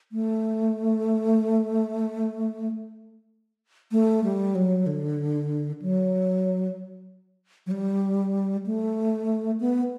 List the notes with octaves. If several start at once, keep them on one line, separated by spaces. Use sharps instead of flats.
A3
A3
G3
F#3
D3
F#3
F#3
G3
A3
B3